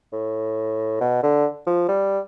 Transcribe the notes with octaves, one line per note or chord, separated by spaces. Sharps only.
A2
B2
D3
F3
G3